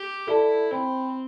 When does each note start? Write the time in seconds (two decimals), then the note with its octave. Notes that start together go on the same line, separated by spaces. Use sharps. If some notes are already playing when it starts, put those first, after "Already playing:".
Already playing: G4
0.27 E4 A4 D5 A5
0.71 C4 C5 G5 B5